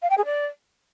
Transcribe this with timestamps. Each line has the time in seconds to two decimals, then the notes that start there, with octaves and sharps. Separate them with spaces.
0.02 F5
0.10 G5
0.18 G#4
0.25 D5